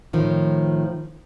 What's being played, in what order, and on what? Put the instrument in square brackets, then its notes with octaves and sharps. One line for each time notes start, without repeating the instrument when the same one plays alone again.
[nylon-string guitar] A2 D#3 F3